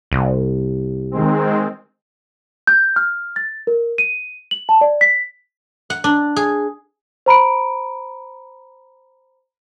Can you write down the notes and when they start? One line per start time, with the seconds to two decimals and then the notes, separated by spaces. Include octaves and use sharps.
0.12 C2
1.11 D#3 G#3 C4
2.67 G6
2.96 F6
3.36 A6
3.67 A#4
3.98 D#7
4.51 F#7
4.69 A5
4.81 D5
5.01 B6
5.90 F#5
6.04 D4
6.36 G#4
7.26 C5 A#5 B5 D7